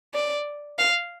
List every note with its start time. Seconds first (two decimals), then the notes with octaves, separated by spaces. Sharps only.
0.14 D5
0.78 F5